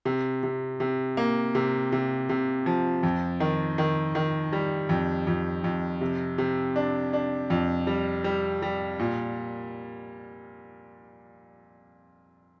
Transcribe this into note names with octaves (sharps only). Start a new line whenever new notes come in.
C3
C3
C3
A#3
C3
C3
C3
F3
F2
D#3
D#3
D#3
G3
F2
F2
F2
C3
C3
D4
D4
F2
G3
G3
G3
A#2